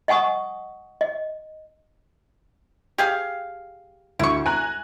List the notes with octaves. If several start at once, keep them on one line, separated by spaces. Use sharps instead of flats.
D#5 F#5 G#5 C#6 D#6
D#5
G4 G#4 F5
D2 E4 C#6
G#5 A#5 F#6